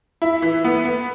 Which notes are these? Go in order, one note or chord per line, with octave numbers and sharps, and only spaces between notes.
E4
E3
B3
B3